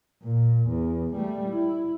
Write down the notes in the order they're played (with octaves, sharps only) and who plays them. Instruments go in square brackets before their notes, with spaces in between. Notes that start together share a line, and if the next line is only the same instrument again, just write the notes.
[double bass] A#2
E2
G3 A3
E4